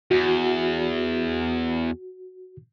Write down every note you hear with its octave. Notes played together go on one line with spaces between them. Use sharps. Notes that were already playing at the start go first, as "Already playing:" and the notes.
E2 F#4